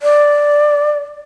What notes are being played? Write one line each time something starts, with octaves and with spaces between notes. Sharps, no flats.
D5